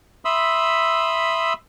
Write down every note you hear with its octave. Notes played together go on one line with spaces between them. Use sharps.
E5 B5 C6 D#6 E6